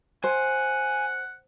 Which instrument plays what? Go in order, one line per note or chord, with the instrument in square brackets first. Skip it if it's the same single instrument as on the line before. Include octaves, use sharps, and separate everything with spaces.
[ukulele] C5 [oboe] F#5 [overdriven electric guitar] G#5